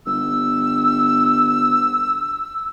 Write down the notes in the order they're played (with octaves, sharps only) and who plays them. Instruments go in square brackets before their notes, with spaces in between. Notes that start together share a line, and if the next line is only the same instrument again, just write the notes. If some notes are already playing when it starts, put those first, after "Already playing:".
[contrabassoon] G1 [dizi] E6